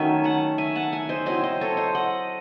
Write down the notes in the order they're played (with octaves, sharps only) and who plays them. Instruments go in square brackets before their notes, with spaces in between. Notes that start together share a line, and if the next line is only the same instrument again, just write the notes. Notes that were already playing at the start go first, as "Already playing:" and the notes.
Already playing: [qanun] D#3 F#3 A3 C#4 E5 G#5
F#5 A5
E5 G#5
F#5 A5
E5 G#5
C5 D#5
F#3 C4 E4 C5 D#5
C5 D#5
A4 C#5
C5 D#5
D#5 F#5